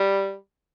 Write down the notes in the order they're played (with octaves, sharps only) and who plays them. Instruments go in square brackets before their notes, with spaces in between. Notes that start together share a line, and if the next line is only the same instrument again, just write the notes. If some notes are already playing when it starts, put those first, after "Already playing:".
Already playing: [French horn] G3